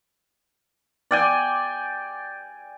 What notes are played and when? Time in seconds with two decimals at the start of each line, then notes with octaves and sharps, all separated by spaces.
1.11 D5 G5 G#5